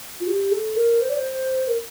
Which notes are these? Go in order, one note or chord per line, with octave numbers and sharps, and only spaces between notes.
F4
G4
A4
A#4
C5
D5
C5
A#4